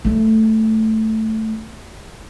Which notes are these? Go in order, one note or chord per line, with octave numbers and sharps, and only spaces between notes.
G3 A3